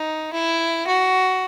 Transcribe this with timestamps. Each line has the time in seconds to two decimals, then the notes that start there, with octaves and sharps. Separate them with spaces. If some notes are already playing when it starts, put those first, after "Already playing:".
Already playing: D#4
0.33 E4
0.87 F#4